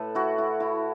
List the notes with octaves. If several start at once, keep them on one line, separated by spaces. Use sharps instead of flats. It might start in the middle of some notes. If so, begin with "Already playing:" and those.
Already playing: A2 A4 B4
E4 F#4
E4
E4